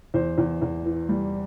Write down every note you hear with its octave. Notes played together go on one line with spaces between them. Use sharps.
E2 C5
E2
E2
E3
G3